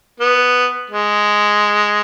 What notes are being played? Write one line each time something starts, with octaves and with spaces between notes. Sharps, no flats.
B3
G#3